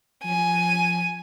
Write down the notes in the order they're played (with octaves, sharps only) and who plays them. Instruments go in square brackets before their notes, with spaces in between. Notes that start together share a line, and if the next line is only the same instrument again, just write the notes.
[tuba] F3 [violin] G#5